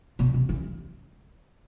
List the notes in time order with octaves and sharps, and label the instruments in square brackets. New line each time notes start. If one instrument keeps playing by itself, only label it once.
[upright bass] B2
C3
E3